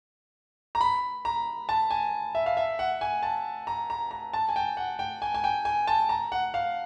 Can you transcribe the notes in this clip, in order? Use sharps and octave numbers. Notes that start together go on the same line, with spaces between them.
A#5
B5
A#5
A5
G#5
E5
F5
E5
F#5
G#5
A5
A#5
A#5
A#5
A5
G#5
G5
F#5
G5
G#5
G#5
G5
G#5
A5
A#5
F#5
F5